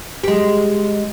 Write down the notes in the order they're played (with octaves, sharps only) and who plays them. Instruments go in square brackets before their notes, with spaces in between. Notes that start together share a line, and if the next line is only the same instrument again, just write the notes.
[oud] G#3 G4